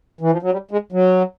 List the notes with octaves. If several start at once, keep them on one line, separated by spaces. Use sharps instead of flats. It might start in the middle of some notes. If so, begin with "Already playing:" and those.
E3
F3
F#3
G3
G#3
F#3